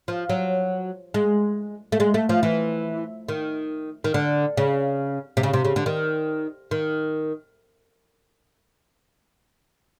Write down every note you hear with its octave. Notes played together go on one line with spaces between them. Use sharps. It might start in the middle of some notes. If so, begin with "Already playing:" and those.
F3
F#3
G#3
A3
G#3
A3
F3
E3
D#3
D#3
D3
C#3
C3
C#3
C3
C#3
D3
D#3
D#3